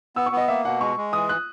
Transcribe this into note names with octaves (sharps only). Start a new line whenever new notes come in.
B3 E6
C#6
B3 D#5
A#3 E5
B2 F#5
G#3 C#6
G#3
E3 D#6
F#6